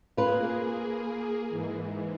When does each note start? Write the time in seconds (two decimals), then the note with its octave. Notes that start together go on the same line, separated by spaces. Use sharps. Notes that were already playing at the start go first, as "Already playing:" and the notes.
0.17 A#3 F4 G#4 B4
1.49 G#2 E3